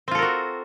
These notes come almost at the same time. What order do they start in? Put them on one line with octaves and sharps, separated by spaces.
C4 F4 A4 A#4 F#4